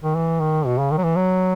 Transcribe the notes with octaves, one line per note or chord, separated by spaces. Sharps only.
D#3
E3
D#3
B2
C#3
D#3
F#3
E3
F#3